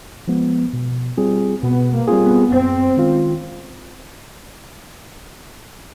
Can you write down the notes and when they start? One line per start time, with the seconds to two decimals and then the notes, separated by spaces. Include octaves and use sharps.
0.28 F3 G#3 B3
0.73 B2
1.17 G3 C4 F4 G#4
1.63 B2 B3
1.92 A#3
2.08 G3 C4 F4 G#4
2.22 B3
2.52 F#2 C4
2.97 D#3 G#3 C#4 F4